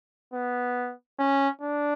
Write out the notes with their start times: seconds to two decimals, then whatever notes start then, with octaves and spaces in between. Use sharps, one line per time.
0.33 B3
1.19 C#4
1.61 D4